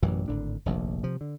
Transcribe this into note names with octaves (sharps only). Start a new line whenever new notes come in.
A1 F#2 B2 E3
G#1 A2 D3 D4
F1 A#1 D#2
C3 F3
D3